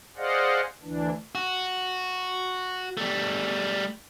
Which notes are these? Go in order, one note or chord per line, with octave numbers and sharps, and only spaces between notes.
G#4 C5 D5 D#5 F5 F#5
D2 E3 D4
F#4
G3 A3